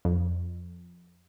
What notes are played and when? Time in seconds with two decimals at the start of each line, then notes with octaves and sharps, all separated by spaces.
0.05 F2